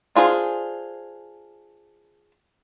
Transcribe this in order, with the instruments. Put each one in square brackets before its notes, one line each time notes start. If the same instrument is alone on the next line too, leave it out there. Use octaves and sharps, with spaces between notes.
[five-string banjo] D4 F4 G#4 B4 C5